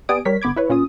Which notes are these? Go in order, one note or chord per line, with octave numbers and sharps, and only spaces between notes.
B3 G4 D5 G#5 D#6 D7
G3 A#4 C#5 B6
G1 B3 B5 D6 G#6
E4 B4 C#5
A#2 C#4 F4 D#6